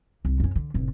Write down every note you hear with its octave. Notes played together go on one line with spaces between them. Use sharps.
C2
F#2 C#4
D3
F1 A2